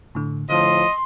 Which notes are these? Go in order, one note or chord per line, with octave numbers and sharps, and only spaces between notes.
A2 D3
A2 D3 F3 D#5 C6